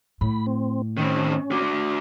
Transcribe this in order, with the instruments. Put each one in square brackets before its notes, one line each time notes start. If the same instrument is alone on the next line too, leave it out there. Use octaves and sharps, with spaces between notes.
[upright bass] A2 [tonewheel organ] B5
[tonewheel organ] C4
[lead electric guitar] D#3 C4 [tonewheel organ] C#4
[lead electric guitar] D4 F#4